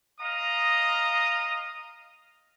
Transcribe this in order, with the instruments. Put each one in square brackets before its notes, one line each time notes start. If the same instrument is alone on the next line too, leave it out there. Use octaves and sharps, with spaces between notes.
[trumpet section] D#5 F5 A#5 D#6